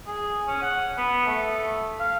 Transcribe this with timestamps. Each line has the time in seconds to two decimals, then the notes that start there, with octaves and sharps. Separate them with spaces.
0.07 G#4
0.47 C#4
0.62 F#5
0.97 B3
1.27 A3
2.00 F5